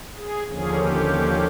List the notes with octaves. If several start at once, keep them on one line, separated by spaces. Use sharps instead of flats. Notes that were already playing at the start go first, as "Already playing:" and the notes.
G#4
D#2 D3 F3 A#3 C#4 G#4
G4